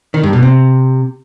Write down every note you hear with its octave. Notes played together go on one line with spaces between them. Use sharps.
D#3
G2
B2
C3